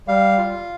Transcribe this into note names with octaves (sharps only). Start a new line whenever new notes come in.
G3 F5
F4